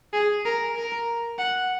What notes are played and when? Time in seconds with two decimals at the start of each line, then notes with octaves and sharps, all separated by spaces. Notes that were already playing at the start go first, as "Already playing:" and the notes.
0.13 G#4
0.45 A#4
0.76 A#4
1.38 F#5